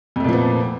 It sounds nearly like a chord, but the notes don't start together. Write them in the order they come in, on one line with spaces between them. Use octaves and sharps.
F2 A3 A#2 F3 B3